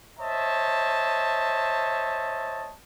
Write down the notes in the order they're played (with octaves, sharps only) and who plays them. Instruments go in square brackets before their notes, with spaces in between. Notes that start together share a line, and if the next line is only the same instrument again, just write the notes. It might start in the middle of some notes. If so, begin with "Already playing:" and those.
[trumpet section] C5 C#5 D#5 E5 A5